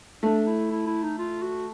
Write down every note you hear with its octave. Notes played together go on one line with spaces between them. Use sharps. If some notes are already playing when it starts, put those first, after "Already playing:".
A3 D4
E4
E4
E4
D#4
F4
F#4